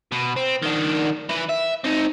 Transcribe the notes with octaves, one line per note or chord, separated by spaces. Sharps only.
B2
C4
D#3 D4
E3 B4
E5
C4 D#4